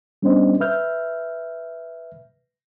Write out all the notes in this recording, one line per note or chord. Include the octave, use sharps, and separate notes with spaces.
G3 B3 C#4 D4 C5 D#5
B4 E5 F6 G6